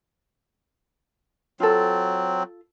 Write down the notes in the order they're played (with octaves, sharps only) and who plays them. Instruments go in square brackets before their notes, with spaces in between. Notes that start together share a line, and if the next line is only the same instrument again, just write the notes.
[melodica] F#3 C4 [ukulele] F4 A4